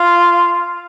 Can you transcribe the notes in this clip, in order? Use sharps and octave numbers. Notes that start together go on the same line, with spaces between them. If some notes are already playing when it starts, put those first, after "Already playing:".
Already playing: F4